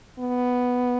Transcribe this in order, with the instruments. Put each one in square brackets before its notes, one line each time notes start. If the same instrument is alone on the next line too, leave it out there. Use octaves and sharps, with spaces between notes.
[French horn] B3